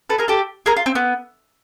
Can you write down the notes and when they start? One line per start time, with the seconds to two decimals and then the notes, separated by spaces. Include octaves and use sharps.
0.10 A4 B4
0.18 G#4 A#4
0.28 G4 A4
0.66 G#4 A#4
0.77 F4
0.86 C4
0.95 B3